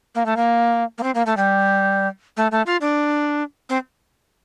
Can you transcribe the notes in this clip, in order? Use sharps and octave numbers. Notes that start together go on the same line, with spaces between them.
A#3
A3
A#3
A#3
C4
A#3
A3
G3
A3
A3
F4
D4
C4